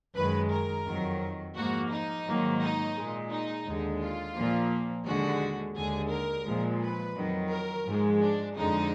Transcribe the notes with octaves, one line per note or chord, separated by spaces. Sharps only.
F#2 D#3 G#3 B4
A#4
F2 D#3 F#3
G#2 F3 A#3 F#4
D#4
G#2 D#3 F#3 A#3
D#4
A#2 G#3
D#4
D#2 D3 G#3
F4
A#2 F3 A#3
D#2 D3 G#3 F#4
D#2 D3 G#3 G#4
A#4
A#2 F3 G#3
B4
F2 D#3 F#3
A#4
G#2 F3 G#3
D4
F2 D3 G#3 D#4